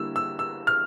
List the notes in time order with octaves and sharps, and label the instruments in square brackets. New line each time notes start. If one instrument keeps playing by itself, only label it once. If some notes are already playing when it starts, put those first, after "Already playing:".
Already playing: [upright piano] D3 G3 A#3 E4 [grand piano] E6
[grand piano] E6
E6
F6